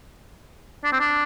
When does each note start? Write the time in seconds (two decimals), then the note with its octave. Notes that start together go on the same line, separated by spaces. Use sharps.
0.84 D4
0.92 C4
1.00 D4